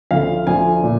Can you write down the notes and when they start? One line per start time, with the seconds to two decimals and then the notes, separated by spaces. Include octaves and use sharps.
0.11 D2 D3 F3 F5
0.47 D2 D3 F3 G#5
0.84 A#2